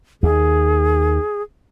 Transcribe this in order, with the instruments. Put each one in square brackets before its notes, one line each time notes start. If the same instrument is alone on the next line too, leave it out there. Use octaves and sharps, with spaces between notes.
[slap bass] D#2 [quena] G#4